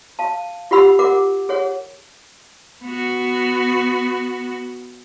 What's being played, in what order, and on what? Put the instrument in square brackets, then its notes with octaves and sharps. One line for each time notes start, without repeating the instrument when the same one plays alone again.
[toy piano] F5 A5
F4 G4 F#5 B5 E6
A#4 F#5 D6
G#4 C#5 F#5
[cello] B3 F#4